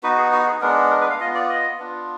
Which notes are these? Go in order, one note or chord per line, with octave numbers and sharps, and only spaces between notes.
B3 D#4 F#4 B4
G#4
F#4
G#4
G#3 B3 D4 A#4
A#4
B4
F5
B3 F4 D#5
D5
D#5
B3 D4 F4